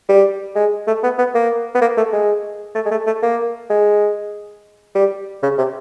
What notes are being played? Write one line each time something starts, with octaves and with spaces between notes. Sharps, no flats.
G3
G#3
A3
B3
B3
A#3
B3
A#3
A3
G#3
A3
G#3
A3
A3
A#3
G#3
G3
C#3
C3